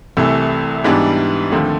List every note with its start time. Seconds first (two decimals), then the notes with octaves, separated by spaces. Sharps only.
0.17 C2 C3 E3 A3
0.84 G#2 E3 G3 B3 D4
1.52 D#2 D3 F3 A3 C4